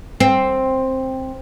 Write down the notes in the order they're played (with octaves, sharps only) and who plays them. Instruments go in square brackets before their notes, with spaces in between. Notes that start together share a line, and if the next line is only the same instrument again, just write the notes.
[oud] C4